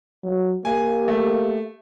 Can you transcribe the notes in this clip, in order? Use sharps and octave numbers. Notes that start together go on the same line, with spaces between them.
F#3
A#3 G4 G#5
A3